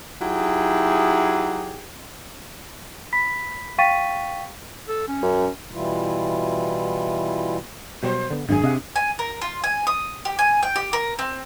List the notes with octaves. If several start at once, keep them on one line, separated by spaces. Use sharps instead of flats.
F#3 D#4 E4 G4 G#4
B5 B6
F5 G5 C#6 A6 B6 D#7
A4
C#4
F#2
B2 E3 G3 E4 F4
B2 F#3 G3 C5
D3 B3
G#1 F#2 D4 G#4 G#5
C3 D#5 F5 F#5
G#5
A#4
F4
G#5
D#6
G4
G#5
G5
G4
A#4
C4